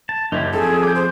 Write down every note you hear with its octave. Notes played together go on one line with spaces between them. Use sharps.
A5
F#1 D#4 E4 G4
F3 C4 G#4 A4
D6 G6
C5